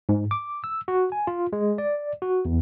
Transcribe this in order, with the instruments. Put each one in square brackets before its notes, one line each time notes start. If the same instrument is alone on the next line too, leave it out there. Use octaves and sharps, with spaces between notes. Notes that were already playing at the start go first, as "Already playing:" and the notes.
[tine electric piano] G#2
D6
E6
F#4
G#5
F4
G#3
D5
F#4
E2